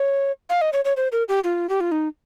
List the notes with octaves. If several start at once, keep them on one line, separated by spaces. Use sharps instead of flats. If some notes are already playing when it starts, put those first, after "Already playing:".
Already playing: C#5
F5
D#5
C#5
C#5
C5
A#4
G4
F4
G4
F4
D#4